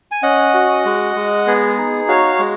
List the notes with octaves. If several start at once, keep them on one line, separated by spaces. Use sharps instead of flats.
G#5
C#4 D#5 F#5
F#4
G#3
G#3
B3 G#4
D#4
F#4 C#5 F5
G#3